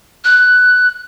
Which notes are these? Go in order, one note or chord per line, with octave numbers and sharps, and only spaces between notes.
F#6